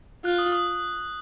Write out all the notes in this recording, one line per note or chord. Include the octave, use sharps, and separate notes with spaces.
F4 F#6
D#6
D#6
D#6